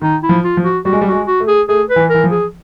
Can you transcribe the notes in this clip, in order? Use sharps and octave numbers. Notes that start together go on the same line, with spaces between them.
D#3 D#4
E4
F3
F4
F3
F#4
G3 F#4
G#3
G3
F#4
G#3
F#4
A3
G#4
A3 G#4
B4
E3
E3 A#4
F3
G#4